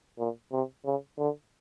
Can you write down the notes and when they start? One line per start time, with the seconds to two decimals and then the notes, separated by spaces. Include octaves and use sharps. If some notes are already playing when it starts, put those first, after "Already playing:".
0.19 A#2
0.52 C3
0.85 C#3
1.18 D3